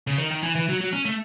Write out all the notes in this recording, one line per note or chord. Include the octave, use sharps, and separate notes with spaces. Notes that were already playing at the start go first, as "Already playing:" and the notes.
C#3
D#3
D#3
E3
E3
F#3
F#3
C#4
A3